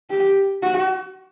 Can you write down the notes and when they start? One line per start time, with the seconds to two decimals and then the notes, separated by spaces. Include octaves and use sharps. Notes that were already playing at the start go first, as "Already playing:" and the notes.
0.10 G4
0.63 F#4